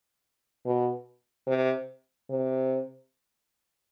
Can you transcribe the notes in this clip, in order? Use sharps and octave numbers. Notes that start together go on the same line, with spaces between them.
B2
C3
C3